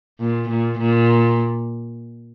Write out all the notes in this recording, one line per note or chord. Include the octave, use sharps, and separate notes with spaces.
A#2
A#2
A#2